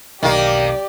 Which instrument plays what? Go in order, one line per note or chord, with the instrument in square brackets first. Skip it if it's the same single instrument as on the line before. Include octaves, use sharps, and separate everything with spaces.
[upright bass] E1 B1 [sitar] D#3 A#3 [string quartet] G4 D5